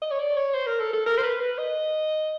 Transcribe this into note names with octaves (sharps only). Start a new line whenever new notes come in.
D#5
C#5
D5
C#5
C5
A#4
A4
A4
A#4
C5
B4
B4
D#5